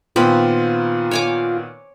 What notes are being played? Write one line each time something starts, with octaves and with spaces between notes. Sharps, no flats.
A#2 D#3 B3 C4 F4 B5
C#5 G#5 D6